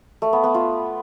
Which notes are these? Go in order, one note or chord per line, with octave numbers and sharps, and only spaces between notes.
A3
B3
B3
F4